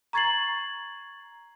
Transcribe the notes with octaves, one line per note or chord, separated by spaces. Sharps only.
A#5 C#6 G#6 A6 C7 F#7